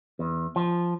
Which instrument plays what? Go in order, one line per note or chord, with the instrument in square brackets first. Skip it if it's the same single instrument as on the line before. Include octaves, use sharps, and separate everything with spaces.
[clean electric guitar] E2
F3